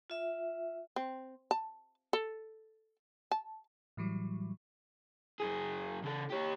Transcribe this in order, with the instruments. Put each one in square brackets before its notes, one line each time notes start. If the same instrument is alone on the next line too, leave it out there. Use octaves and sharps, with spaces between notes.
[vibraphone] F4 E5
[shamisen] C4
A5
A4
A5
[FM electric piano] A2 E3 F#3 G3
[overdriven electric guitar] F#2 G#4
C#3 A4
G4 C#5